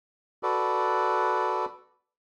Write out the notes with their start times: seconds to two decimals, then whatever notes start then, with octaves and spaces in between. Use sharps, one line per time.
0.43 F#4 A4 B4 D5